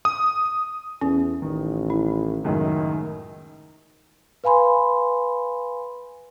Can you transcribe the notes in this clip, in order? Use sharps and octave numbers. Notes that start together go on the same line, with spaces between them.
D#6
E2 C#4
A1 D#3
E4
C#2 F#2 A2 D#3
B4 F5 G#5 B5 C6